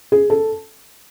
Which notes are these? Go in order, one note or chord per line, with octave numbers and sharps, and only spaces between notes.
G#4
A4